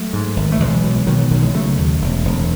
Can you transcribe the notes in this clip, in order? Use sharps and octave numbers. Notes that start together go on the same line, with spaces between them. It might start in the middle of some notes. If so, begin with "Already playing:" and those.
Already playing: F#3 A3
G#2
G#1
A3
B1 E3 G#3
B2
B2 D#3 F#3
D#3 F#3
B1 D#3 F#3
E3 G#3
C#3 F#3 A3
D#2
E1
E1